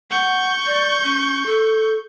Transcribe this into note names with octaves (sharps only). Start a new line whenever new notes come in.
F#5 C#6 G6
D5
C#4
A4